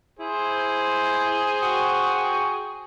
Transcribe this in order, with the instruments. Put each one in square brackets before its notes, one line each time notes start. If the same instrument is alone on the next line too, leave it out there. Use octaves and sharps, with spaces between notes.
[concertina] E4 [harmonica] G#4 [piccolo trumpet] C5
[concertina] F#4 G5 C#6